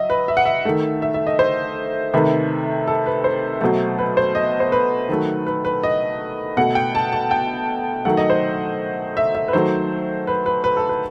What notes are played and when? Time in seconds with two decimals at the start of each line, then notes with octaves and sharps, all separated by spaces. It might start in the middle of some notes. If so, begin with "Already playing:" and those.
Already playing: F#3 D#5 E5
0.10 B4
0.28 E5
0.37 F#5
0.45 E5
0.65 D#3 A3
1.02 E5
1.14 E5
1.27 D#5
1.39 C5
2.13 C3 D#3 A3 B4
2.87 A4
3.06 B4
3.24 C5
3.61 B2 F#3 A3
3.99 B4
4.17 C5
4.35 D#5
4.60 C5
4.72 B4
5.09 D#3 F#3 A3
5.47 B4
5.65 B4
5.83 D#5
6.57 B2 A3 F#5
6.75 G5
6.95 A5
7.12 A5
7.31 G5
8.05 D#3 F#3 A3 F#5
8.17 D#5
8.30 C5
9.17 E5
9.35 E5
9.48 B4
9.53 D#3 F#3 A3 C5
10.27 B4
10.46 B4
10.64 B4
10.77 A4
10.89 B4